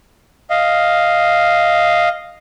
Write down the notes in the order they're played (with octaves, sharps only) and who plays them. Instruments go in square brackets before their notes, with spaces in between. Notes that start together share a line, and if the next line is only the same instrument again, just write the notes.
[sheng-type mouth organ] D#5 F5